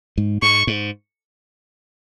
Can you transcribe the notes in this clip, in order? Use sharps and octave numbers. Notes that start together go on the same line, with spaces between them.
G#2
G#2 C#6
G#2